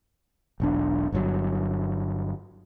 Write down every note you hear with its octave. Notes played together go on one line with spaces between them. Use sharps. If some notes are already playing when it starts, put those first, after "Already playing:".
E1 B1 D4
G1 G2 B2 F#3